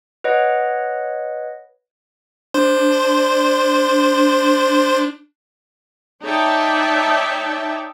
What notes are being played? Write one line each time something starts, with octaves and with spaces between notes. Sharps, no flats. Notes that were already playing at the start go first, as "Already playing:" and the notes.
B4 C#5 D#5 F#5
D4 C5 C6
D#4 C#5 D5 E5 G5 A5